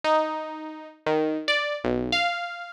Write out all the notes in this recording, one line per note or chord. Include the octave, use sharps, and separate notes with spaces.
D#4
D#3
D5
B1
F5